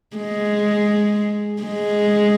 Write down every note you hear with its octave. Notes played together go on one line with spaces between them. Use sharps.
G#3
G#3